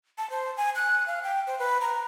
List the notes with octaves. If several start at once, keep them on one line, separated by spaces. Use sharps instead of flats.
A5
C5
G#5
F#6
F5
G5
C5
B4
A#5